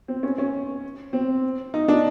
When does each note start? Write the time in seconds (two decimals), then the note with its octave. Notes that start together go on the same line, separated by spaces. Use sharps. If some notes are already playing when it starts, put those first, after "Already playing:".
0.08 C4
0.23 C#4
0.38 C#4
1.13 C4
1.74 D#4
1.88 D4